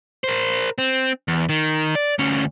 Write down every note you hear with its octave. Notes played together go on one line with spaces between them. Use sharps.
A#4 C5
C4
E2
D#3
D5
D2 C#4